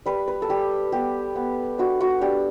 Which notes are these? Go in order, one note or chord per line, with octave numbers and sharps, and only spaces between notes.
G3 B4
B4
A4
G3 G4
B3 G4
B3
D4 F#4
F#4
D4 G4